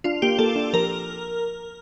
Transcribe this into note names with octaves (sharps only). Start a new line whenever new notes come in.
D4 F4
A#3 G4
A#3 A4
D4
F3 A#4